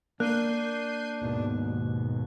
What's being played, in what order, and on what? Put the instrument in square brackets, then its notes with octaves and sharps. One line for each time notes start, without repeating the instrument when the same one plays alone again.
[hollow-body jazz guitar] A#3 [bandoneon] D4 [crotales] F#6 [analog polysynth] G6 C7 D#7
[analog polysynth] D#2 G#2 B2